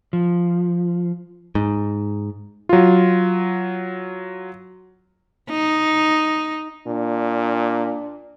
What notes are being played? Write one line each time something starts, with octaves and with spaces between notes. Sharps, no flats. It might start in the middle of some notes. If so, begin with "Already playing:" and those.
F3
G#2
F#3 F4
D#4
A#2 D4